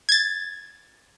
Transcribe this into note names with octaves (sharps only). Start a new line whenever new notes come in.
G#6 A6